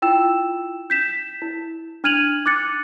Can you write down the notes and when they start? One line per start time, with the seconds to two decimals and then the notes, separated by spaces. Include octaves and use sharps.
0.02 E4 F4 G5 E6 E7
0.90 G6 B6 E7
1.42 E4
2.04 D4 F6 G#6 D#7 F7 F#7
2.46 D6 F#6 A6 C#7